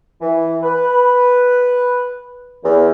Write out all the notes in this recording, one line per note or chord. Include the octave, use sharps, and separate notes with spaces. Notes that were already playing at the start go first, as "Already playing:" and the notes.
E3
B4
E2